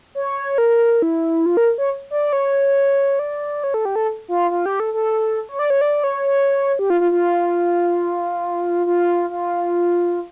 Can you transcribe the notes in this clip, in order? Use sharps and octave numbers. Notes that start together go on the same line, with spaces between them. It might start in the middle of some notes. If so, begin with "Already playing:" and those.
C#5
A#4
E4
F4
A#4
C#5
D5
C#5
D5
C#5
A4
G4
A4
F4
F4
G4
A4
A4
C#5
D5
C#5
D5
C#5
G4
F4
F4
F4
F4
F4